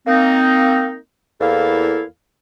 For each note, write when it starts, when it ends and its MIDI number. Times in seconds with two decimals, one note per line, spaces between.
0.07 0.95 58
0.07 0.95 60
0.07 0.95 63
1.40 2.03 40
1.40 2.03 58
1.40 2.03 64
1.40 2.03 69
1.40 2.03 77